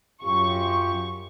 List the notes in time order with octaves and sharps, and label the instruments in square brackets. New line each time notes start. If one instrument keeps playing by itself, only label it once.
[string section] F#2 C#6 [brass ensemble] F4 G4